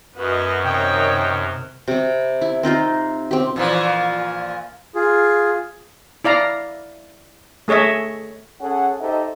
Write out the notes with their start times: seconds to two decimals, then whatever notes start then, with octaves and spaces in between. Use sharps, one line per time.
0.16 F#2 F#4 B4 D#5
0.64 C3 D#3 C#5 D#5 G5
1.88 C3 G3
2.41 E4
2.63 C4 D#4 F4 C5
3.31 C4 G4
3.56 A#2 E3 F3
4.95 F4 G#4
6.24 E4 D5 F5 A#5
7.68 A3 G#4 C#5 D#5 E5
8.61 C#4 G#4 A4 F#5
9.01 D#4 G4 A4 C5 D#5 E5